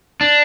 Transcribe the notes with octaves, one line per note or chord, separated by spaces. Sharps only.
D4